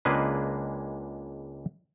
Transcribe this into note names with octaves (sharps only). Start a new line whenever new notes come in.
C#2 G#3 A#3 D4 G#4 B4